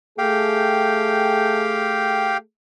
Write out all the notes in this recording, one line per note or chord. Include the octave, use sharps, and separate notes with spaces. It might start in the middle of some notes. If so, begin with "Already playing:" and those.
A3 G4 G#4 F5 G5